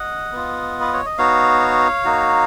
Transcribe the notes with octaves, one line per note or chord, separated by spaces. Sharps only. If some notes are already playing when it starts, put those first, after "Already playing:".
Already playing: D#5 F#5
B3 F4
B4
C#5
D#5
B3 D#4 F#4 C#5 F5
A#3 D#4 F#4